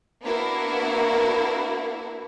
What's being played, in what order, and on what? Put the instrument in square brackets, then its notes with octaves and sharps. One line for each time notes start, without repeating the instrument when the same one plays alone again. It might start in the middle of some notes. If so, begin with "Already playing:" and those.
[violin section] A#3 B3 D4 E4 F#4 A#4